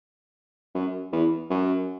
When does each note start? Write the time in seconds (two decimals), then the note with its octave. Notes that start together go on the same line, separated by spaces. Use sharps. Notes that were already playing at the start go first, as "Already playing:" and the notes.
0.75 F#2
1.13 E2
1.50 F#2